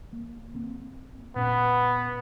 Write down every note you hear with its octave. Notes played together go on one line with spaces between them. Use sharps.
A#3
A#3 C4
A#2 B3 C#4